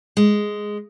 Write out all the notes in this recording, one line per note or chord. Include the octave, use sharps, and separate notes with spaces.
G#3